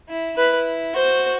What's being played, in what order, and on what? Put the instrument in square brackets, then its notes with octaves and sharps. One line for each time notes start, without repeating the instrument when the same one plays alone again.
[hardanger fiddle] E4
[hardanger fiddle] E4 [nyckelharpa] B4
[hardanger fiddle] F#4 [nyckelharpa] C5